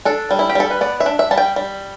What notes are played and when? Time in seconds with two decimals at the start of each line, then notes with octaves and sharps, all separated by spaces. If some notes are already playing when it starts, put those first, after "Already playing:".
0.05 D4 A4
0.31 G3
0.39 E4
0.49 G4
0.55 G3 A4
0.70 B4
0.81 B3 D5
1.00 E5
1.06 D4
1.19 E5
1.31 G3 A5
1.38 G5
1.56 G3